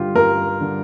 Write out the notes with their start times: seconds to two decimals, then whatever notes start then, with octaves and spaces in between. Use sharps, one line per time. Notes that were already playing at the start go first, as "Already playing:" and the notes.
Already playing: G2 D3 F4 G4
0.15 G2 A#4
0.61 D3